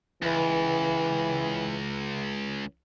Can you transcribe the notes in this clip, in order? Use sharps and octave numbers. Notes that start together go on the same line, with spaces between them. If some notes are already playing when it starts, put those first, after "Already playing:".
C#2 E3